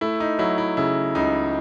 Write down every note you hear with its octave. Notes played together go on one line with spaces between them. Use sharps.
A3 E4
D#4
F#3 E4
E4
C#3 E4
C#2 D#4